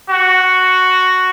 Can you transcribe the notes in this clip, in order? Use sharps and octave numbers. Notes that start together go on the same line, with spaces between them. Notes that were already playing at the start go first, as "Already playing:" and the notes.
F#4